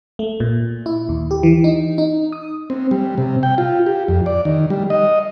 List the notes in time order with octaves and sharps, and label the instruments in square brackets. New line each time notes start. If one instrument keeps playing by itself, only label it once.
[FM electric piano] A3
A#2
E4
D#2
G4
E3
D#4
D#4
D#6
[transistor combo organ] C4
G3
C3
G5
F4
G4
F2
D5
D#3
G3
D#5